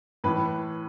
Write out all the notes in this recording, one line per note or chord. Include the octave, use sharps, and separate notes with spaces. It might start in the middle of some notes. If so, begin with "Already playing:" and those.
A2 E3 B4